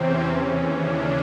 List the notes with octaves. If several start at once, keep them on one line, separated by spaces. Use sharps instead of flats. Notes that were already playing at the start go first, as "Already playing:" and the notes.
Already playing: E2 C3 E3 C4 C#4
D#2 C#3 E3 C#4
D4